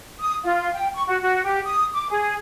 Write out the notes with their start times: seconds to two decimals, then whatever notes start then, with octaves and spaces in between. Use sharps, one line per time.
0.21 D#6
0.44 F4
0.73 G5
0.95 C#6
1.08 F#4
1.22 F#4
1.45 G4
1.65 D#6
1.94 D6
2.11 G#4